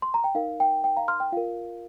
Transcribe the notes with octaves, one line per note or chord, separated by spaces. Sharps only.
C6
A#5
G5
D#4 A#4 F5
G5
G5
F5 A#5
C6 F6
G5
F4 A#4 F5